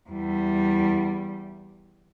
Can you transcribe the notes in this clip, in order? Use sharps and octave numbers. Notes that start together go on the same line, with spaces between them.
E2 G3